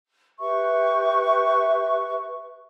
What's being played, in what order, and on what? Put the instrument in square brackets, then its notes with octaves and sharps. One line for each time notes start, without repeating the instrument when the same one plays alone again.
[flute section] G4 B4 E5 C#6